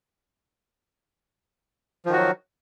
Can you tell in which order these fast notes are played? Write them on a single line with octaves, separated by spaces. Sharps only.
F3 D#3 F#4 F#3